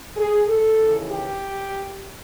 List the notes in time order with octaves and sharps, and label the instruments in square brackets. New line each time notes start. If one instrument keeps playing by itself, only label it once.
[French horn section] G#4
A4
D#2 C#3 E3
G4